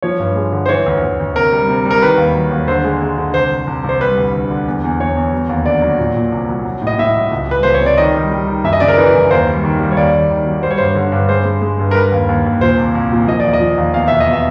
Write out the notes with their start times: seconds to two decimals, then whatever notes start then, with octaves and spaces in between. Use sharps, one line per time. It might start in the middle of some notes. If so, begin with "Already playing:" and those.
0.02 F3 C#5
0.20 G2
0.36 G#3
0.52 D3
0.66 C5
0.69 E3 C#5
0.86 D2
1.02 D2
1.20 D2
1.36 C3 A#4
1.52 G3
1.68 C3
1.85 G3
1.91 A#4
2.02 D#3 B4
2.18 D#2
2.35 F#3
2.51 D#2
2.68 D3 C5
2.84 G#3
3.02 G#3
3.18 D3
3.34 C2 C5
3.51 C2
3.67 C2
3.84 C2 C5
4.00 G3 B4
4.17 D2
4.34 D3
4.51 D3
4.67 E2
4.84 E2
4.99 E2 C#5
5.17 E2
5.33 F#3
5.49 D#2
5.66 D3 D5
5.82 F#3
5.99 A#2
6.16 A#2
6.32 C2
6.49 F#3
6.65 F#3
6.82 A2
6.87 D#5
6.98 A2 E5
7.16 F#3
7.31 C#2
7.48 G3 B4
7.63 C#2 C5
7.74 C#5
7.81 C3
7.86 D5
7.98 D#3 D#5
8.14 G3
8.31 G3
8.47 D#3
8.64 F#2 E5
8.73 D#5
8.80 C#3 D5
8.88 A#4
8.97 E3 B4
9.14 F#2
9.30 D#2 C5
9.46 G3
9.64 D#3
9.79 G3
9.91 C#5
9.97 D#2 D5
10.13 D#2
10.30 D#3
10.46 F#3
10.63 G3 C5
10.71 C#5
10.78 G2 C5
10.96 D3
11.12 G2
11.29 G#3 C5
11.45 G#3
11.62 G#3
11.79 G2
11.91 A#4
11.95 G3 B4
12.12 D#2
12.28 D#2
12.46 D#2
12.61 A#2 C5
12.78 C2
12.95 C2
13.12 A#2
13.27 F3 D#5
13.40 D#2 D5
13.53 D#5
13.60 F3
13.78 D#2
13.93 E2 F5
14.08 B2 E5
14.20 D#5
14.27 B2
14.33 E5